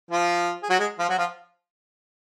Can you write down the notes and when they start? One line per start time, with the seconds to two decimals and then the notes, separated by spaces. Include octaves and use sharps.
0.11 F3 F4
0.63 G#4
0.70 F#3 F#4
0.79 G#3 G#4
0.99 F3 F4
1.09 F#3 F#4
1.18 F3 F4